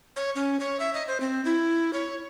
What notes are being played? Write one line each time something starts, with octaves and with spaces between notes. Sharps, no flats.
C#5
C#4
C#5
E5
D#5
C5
C4
E4
C#5